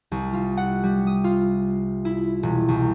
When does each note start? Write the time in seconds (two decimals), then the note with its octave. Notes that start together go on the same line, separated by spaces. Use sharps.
0.12 C2
0.33 F4
0.57 F#5
0.83 G3
1.07 D#6
1.24 F4
2.05 E4
2.43 E1
2.68 C2